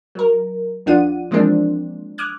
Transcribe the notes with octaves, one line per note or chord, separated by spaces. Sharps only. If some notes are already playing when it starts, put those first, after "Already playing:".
F#3 A#4
D#2 F3 D4 F4 F#5 D#7
E3 F3 G#3 A#3 C4 D4
D6 D#6 F6 F#6 G#6